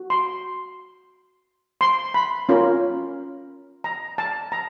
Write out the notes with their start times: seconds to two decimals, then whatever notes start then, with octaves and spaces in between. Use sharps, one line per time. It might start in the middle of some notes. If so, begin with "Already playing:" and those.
Already playing: F#4
0.10 C6
1.81 C6
2.14 B5
2.49 C#4 F4 A#4
3.84 A#5
4.18 A5
4.52 A#5